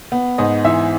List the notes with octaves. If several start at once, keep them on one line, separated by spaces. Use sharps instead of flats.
B3
G#2 D#5
E3 E5